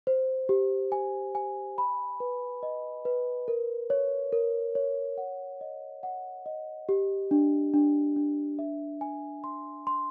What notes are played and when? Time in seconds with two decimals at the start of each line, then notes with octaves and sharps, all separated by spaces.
0.07 C5
0.49 G4
0.92 G#5
1.35 G#5
1.78 B5
2.20 B4
2.63 D#5
3.05 B4
3.48 A#4
3.90 C#5
4.33 A#4
4.75 C#5
5.18 F#5
5.61 D#5
6.03 F#5
6.46 D#5
6.89 G4
7.31 D4
7.74 D4
8.16 D4
8.59 E5
9.01 G#5
9.44 C6
9.87 C6